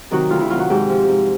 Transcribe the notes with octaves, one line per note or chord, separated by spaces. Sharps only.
C3 D#3 F#3 F#4
D2 F4
E4
C3 D#3 F#3 F4
F#4
G#2 G4
F3
G#2